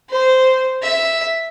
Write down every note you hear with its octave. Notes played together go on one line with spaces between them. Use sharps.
C5
E5